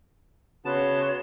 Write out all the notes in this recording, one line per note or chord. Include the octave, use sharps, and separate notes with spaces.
C#3 B3 F#4 C#5 A5 C6